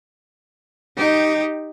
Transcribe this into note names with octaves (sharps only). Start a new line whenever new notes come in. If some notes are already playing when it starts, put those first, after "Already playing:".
D#4 G4